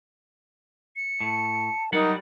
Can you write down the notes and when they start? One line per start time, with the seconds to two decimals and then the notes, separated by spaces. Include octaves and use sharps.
0.96 C#7
1.21 A2 A5
1.93 F#3 G3 D#4 A#4 F#5